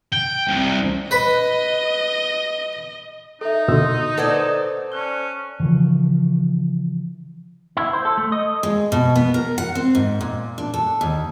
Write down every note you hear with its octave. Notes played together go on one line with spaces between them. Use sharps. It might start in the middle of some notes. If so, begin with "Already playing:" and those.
G5
C2
B4 D#5 B5
D#4 A4 E5
B2 D3 C6 D#6 E6
A4 B4 C5 D5 F#5 G#6
C#4 A5 F#6 G7
C#3 E3 F3
E4
C5
A4
A3
D#5
G#3
B2
B3
A#4
F#5
C4
G#2
A#2
D4
A4
D#2